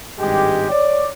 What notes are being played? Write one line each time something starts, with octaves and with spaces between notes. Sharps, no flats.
G#1 G2 G#3 G4
C#5 D5